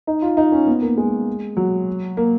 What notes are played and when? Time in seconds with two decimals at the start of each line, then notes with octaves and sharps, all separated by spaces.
0.07 D#4
0.22 F4
0.37 D#4
0.52 C#4
0.67 B3
0.82 A#3
0.97 G#3
1.57 F#3
2.17 A#3